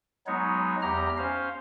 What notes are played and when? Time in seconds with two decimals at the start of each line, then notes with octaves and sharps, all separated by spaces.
0.27 F#3 G#3 B3 D#4 C#5
0.82 E2 G4 A#5 F6
1.18 C#4 C5 F5